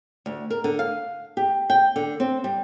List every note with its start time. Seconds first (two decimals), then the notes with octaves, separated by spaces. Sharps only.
0.26 D2
0.50 A#4
0.64 D3
0.79 F5
1.37 G4
1.70 G5
1.96 D3
2.20 C4
2.44 G3